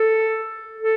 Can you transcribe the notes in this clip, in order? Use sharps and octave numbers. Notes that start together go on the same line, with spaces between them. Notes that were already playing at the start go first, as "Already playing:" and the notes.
Already playing: A4
A4